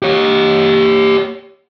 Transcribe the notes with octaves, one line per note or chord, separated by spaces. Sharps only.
G4 C#5